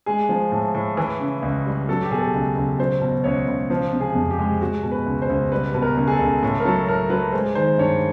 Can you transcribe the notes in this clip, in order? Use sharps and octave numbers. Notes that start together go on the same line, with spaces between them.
G#3 G#4
F3
A2
A2
E3
C#3
C#2
G3
F#3 A4
G4
B2 G#4
A4
C#2
C#2
F#3 C5
B2
C#2 C#5
C#2
F3 C5
C3
G#4
F2
G4
G#3
G#3 F#4
B2
B4
C#2
C5
C#2
G3 B4
B2 B4
A#4
C#2
G#4
A4
C#2
A2
A#4
F#3 A4
A2 A#4
F#3 B4
G#3 C5
D#3 C5
G2 C#5